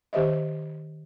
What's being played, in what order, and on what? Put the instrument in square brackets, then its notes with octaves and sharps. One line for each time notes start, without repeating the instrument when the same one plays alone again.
[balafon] D#3 G4 C5 D#5 E5